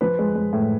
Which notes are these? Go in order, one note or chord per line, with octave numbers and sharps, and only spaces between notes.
F3 B4
G#3
G#3
A2